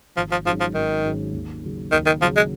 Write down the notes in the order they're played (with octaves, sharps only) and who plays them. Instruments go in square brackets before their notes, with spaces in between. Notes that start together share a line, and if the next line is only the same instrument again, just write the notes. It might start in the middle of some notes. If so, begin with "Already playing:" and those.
[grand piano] G#1 [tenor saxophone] F3
[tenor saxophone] F3
[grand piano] G#2 F#3 C#4 [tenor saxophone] F3
[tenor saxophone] F3
[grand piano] G#1 [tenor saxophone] D#3
[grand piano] G#2 F#3 C#4
D#2
C#3 F#3
[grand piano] D#2 [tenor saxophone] D#3
[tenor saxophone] D#3
[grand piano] C#3 F#3 [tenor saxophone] F3
[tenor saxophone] G#3